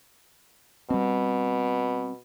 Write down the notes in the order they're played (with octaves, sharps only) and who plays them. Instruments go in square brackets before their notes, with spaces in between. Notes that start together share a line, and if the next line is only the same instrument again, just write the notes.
[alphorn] B2 [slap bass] G3 C4